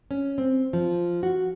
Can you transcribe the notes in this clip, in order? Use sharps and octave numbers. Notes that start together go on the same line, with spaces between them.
C#4
C4
F3
F#4